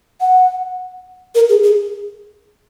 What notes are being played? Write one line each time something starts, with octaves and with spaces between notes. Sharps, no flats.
F#5
A#4
G#4
G#4